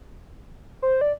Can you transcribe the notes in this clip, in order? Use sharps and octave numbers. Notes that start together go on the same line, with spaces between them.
C5
D5